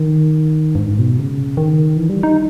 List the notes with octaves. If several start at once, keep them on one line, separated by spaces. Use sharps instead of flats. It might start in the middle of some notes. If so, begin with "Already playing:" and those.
Already playing: D#3
G2
G#2
B2
C#3
D#3
E3
G3
D#4